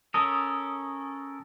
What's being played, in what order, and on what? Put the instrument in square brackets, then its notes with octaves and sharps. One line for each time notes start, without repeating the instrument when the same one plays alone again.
[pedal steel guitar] C#4 A4 A#4 [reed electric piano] D#6